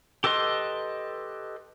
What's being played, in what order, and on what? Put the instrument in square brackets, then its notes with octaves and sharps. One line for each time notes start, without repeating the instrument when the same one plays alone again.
[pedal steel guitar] G4 A4 B4 D#5 C6